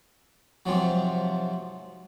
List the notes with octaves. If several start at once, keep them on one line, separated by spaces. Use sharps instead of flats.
G#2 C3 F3 F#3